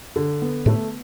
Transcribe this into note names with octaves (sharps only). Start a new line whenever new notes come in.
D3
B3
A2 A3